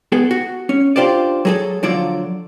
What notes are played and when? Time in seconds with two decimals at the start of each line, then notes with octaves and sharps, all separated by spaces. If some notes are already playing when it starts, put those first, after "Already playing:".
0.12 B3 G#4 A4
0.31 F#4
0.69 C#4
0.96 D4 F4 G4 C5 D5
1.45 F#3 G#4 A4
1.83 D3 F3 F#3 F4 D5